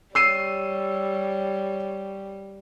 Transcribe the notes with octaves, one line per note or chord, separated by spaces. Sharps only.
G3 C#5 E6 C7 D#7